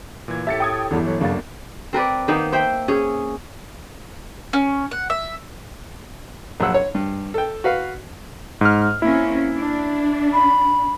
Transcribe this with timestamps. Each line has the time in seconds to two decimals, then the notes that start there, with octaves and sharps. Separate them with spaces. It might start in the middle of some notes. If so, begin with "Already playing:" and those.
0.28 A#2 E3 G#6
0.47 A2 G4 A4 E5 A6 C#7
0.60 G5 D#6 G#6
0.91 G1 E2 E3
1.04 F#3
1.20 F#2 C#3 A#3 D4 F#4 F5 A6
1.93 C4 A#4 B4 D5
2.28 D#3 A#3 B3 D#4
2.52 C5 E5 G5
2.88 C#4 G#4
4.53 C#4
4.91 F#5
5.10 E5
6.60 A#1 F#3 F#5 E6
6.74 C#5
6.95 G2
7.34 A4 G5
7.64 F#4 B4 F5
8.61 G#2 F6
9.02 A#3 C4 C#4 E4
9.55 D4
10.33 B5